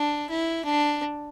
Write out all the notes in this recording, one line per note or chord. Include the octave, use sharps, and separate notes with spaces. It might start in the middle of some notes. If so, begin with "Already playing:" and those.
Already playing: D4
E4
D4